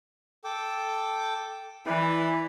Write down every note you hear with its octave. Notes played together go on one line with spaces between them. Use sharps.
A4 G5 D6
E3 E4 B4 D5